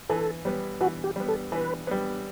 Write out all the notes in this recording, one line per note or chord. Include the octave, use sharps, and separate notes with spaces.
E3 A4
G3 B3
E3 F#4
G4
G3 B3
A4
E3 B4
G3 B3